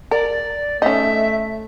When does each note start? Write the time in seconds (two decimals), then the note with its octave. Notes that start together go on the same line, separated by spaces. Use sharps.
0.11 A#4 D5
0.82 A3 C#4 D#4 E5